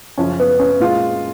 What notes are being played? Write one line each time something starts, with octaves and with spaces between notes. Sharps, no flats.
F#2 C#3 F3 C#4
B3
C#4
A#2 G#3 F4